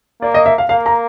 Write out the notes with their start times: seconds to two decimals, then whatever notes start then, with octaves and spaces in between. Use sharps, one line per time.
0.21 A#3 D5
0.34 D#5
0.46 E5
0.58 F5
0.69 A#3 F5
0.86 A#5